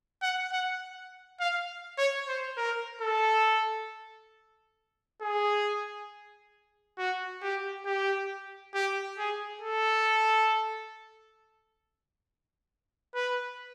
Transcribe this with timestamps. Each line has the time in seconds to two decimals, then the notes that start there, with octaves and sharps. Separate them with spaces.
0.22 F#5
0.52 F#5
1.40 F5
1.98 C#5
2.28 C5
2.57 A#4
3.01 A4
5.22 G#4
6.98 F#4
7.42 G4
7.86 G4
8.74 G4
9.18 G#4
9.62 A4
13.15 B4